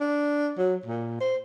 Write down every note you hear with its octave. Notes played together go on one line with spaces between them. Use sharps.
D4
F#3
A#2
C5